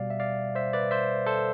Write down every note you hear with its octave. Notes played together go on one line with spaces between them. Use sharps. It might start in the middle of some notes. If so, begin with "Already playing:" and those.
Already playing: B2 G3 D5 F5
E5
D5 F5
C5 E5
B4 D5
C5 E5
A4 C5